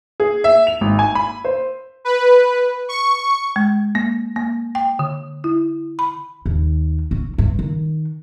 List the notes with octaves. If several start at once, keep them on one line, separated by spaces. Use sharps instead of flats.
G#4
E5
F7
G#1
G#5
B5
C5
B4
C#6
G#3
A#3
A#3
G5
D3
E4
B5
D#2
C#4
G2
D#3